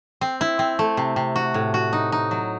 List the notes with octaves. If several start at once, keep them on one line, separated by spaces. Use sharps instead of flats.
C4
E4
C4
A3
C3
C3
F#4
A2
F#4
D#4
D#4
F#3